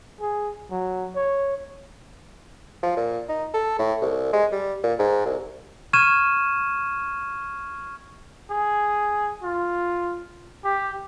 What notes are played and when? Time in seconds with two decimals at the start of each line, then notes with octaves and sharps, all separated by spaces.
0.21 G#4
0.71 F#3
1.16 C#5
2.83 F3
2.97 A#2
3.29 D#4
3.54 A4
3.78 A2
4.01 C2
4.33 G#3
4.52 G3
4.83 A#2
4.99 G#2
5.25 C2
5.93 C#6 F6 G#6 D#7 E7
8.51 G#4
9.43 F4
10.64 G4